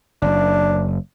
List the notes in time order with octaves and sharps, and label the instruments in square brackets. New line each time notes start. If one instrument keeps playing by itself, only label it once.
[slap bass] F#1 F#2 [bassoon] D4